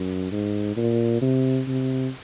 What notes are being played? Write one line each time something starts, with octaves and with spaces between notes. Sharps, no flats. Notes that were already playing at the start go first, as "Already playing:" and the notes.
Already playing: F#2
G#2
A#2
C3
C3